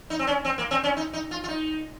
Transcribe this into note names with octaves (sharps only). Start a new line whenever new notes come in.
D#4
C4
C#4
C4
A#3
C4
C#4
D#4
D#4
F4
F4
D#4